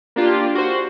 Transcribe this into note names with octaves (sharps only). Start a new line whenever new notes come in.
A#3 D4 F4 G4
F#4 C5